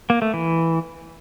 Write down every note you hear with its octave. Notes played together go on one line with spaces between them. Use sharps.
A#3
A3
E3